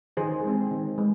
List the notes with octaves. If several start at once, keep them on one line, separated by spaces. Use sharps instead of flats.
D#3 G#4 C5
G#3 C4
D#3
G#3